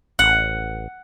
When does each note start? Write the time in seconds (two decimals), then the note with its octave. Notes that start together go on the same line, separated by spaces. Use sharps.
0.19 A1 F#5